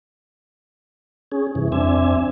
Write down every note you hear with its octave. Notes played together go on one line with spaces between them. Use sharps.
C#4 G#4
G2 C3 E3
F2 C4 D4 E5 G#5